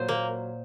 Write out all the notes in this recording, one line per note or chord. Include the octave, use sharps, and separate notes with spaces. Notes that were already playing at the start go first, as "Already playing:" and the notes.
Already playing: A#2 F#3 C5
A#3